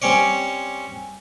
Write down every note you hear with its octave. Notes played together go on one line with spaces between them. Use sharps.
G3 C4 C#4 C#5 D5